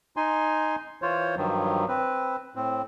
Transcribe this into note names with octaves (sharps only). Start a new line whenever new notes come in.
D#4 G#5 C6
E3 F4 C5 C#5
G2 D#3 F3 F#3
C4 B4
A2 C4